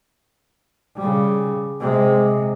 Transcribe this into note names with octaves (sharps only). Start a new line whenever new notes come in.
C#3 G3
C3 G#3